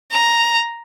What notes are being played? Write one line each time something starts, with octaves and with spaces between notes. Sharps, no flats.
A#5